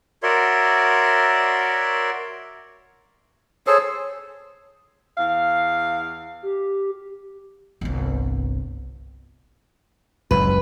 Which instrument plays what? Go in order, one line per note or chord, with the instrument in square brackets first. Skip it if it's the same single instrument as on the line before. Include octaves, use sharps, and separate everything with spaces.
[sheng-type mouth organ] F#4 A#4 C#5 D5 E5 C6
[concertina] G#4 A4 C5 [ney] C#5
[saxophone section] E2 F5
[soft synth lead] G4
[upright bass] G1 C2
[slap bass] F#1 C#2 [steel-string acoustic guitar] B4